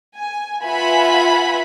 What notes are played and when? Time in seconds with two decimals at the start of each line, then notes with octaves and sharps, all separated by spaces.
0.17 G#5
0.65 F4 B4 E5 F#5 G#5 B5